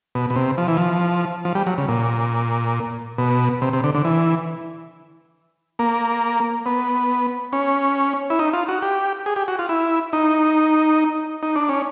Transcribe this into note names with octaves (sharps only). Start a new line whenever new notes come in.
B2
B2
C3
F3
E3
F3
F3
G3
F#3
C#3
A#2
B2
C3
C3
D3
D3
E3
A#3
B3
C#4
E4
D#4
F4
F#4
G4
G#4
G4
F#4
F4
E4
D#4
D#4
D4
C#4